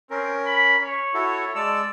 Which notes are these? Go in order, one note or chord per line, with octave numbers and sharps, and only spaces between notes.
C4 C#4 A#4
B5
C#5
E4 F#4 A4
G#3 D5 A5 E6